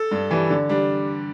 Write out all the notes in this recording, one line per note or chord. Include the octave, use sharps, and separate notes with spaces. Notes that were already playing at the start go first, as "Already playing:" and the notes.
Already playing: A4
G2
E3 G3
D3
G3 D4